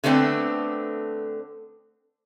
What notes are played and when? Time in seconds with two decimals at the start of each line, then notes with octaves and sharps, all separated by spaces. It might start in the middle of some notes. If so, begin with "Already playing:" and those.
0.04 D3 A3 B3 C4 D4